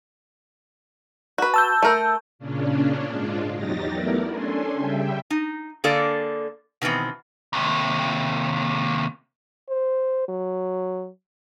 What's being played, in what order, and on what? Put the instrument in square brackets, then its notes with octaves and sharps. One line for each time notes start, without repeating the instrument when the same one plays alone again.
[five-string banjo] F#4 B4
[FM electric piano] A5 E6 G6
[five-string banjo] A3 A#4
[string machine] A#2 C#3 C#4 D4
G#2 G#3 D4 F4
E2 F#3 D#4 G4 A6 A#6
A3 B3 E4 A#4 D5
C#4 D4 A4 G#5 C6
C#3 G3 E5 G5
[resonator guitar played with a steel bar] D#4
D3 A#3 G#4 A4 D5
B2 D#3 E3 B3 C4
[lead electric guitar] D#2 C3
[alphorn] C5
F#3